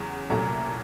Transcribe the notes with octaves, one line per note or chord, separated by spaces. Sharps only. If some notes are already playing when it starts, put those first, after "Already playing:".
Already playing: E2 C#3 F#3
C2 A#2 F#3 A3 A#5